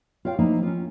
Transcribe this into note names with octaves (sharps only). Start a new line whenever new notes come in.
F4 C#5 F5 G5
F3 A#3 D#4 E4
C#4 F4